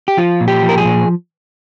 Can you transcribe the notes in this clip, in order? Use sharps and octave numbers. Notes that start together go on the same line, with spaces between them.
G4
F3 F4
A#2
G4
F3
A#4
G#4
A#2